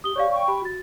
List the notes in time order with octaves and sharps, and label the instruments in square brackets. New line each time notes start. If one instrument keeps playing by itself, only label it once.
[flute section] G4 [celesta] D#6 G7
[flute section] G4 C#6 [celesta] C#5 D5 F5
[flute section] G5 C#6
[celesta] G4 B5
F#4 A6